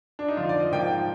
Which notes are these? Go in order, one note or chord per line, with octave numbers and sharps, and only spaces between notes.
D4
D#4
F2 D3 F3 F4
D5
D#5
G#2 F3 A#3 G5